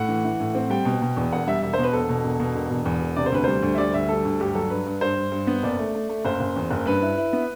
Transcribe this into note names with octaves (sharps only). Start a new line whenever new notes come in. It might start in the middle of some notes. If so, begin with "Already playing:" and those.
Already playing: A2 F#5
E3
E3
A2
C4
G3 G5
B2
B2
E2
E1 F#5
G3 E5
E1 E5
B2 C5
B4
E1 A4
B2
E1
B2
E1
E1
E2
E1
C3 D5
C5
D2 B4
G3 C5
D2
E5
G3 D5
D2 E5
G3 A4
D2
G2 G4
F#3 A4
G2 B4
G2
G2 C5
G2
G2
B3
F#1 D5
A3
A3
A3
F#1 C5
F#1
E2
F#1
G2 B4
E4
E4
B3